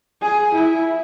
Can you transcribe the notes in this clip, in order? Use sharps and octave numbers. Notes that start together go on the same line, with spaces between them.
G#4
E4